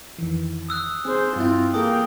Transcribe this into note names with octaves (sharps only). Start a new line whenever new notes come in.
F2 D#3 E3
D#6 E6 F#6
C4 G#4 C5
G2 C4 E4 F4
A#3 F4 G#4 A4 G5 D#6